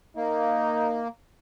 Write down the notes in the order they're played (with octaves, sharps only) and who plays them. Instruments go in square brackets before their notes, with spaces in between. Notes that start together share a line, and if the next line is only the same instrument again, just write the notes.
[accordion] A#3 [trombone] D#4